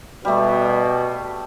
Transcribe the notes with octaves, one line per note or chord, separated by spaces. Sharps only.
B2 G3 A3